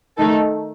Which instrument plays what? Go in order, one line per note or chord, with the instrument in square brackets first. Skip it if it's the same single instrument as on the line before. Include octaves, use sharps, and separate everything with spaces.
[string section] D#3 A3 D#4 A4